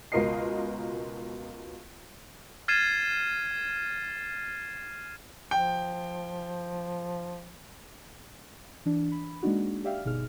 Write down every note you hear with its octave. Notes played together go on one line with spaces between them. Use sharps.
C#2 B2 F4 A#4 D#5 C7
F6 G#6 A6 C7 D#7 E7
F3 G5
E3 D4
B5
G#3 A#3 D4 D#4 F#4
G4 D5 E5 F5 G5 F6
G1 B2 D#4 G#4 F6